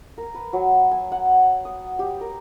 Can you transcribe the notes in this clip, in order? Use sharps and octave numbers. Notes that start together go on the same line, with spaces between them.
A#4
B4
F#3
G#5
F#5
D#6
G4
A#4